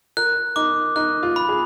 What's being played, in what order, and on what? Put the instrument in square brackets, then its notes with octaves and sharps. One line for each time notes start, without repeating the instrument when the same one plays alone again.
[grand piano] A#4 [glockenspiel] F#6
[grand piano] D#4 [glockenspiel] D6
[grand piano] D#4 [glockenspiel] F#6
[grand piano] F4
[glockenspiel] B5
[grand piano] G#4